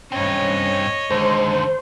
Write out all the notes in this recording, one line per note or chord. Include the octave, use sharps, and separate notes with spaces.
G2 C4 C#4 C#5 D#5
D#2 D3 G#3 C5